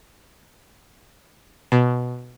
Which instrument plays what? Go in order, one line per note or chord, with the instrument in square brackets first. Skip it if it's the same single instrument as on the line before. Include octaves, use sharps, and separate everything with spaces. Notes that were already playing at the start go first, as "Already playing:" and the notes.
[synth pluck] B2